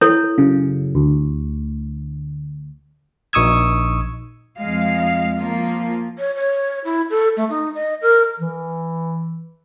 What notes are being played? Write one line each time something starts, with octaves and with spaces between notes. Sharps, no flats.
E4 A4 C#5
F#2 C#3
D2
A#1 D#4 C#6 D#6 E6 G#6
F2 G#3 F5
F3 A#3 F4
C#5
C#5
E4
A4
A3
D#4
D#5
A#4
E3